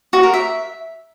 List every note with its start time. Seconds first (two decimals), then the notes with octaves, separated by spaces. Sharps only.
0.13 F#4
0.23 A#4
0.33 E5